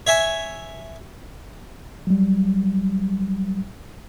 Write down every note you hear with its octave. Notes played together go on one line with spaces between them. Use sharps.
C#5 E5 G#5
F#3 G3